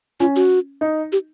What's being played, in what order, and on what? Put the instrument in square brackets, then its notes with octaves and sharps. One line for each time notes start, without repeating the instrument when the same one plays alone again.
[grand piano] C#4 [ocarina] F4
[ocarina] F#4
[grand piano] D#4
[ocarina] G4